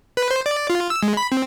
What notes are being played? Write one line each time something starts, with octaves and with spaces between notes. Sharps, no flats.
B4
C5
D5
F4
E6
G#3
B5
C4